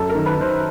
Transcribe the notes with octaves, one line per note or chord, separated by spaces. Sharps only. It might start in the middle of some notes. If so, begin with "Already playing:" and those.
Already playing: F#2 A4
A#4
D#3
B4
D#3 C5